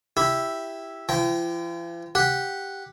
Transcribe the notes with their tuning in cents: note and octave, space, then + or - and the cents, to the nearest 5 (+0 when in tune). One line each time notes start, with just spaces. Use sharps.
E4 +0 G4 +0
F3 -45 G5 -10
G4 +0 F#5 -5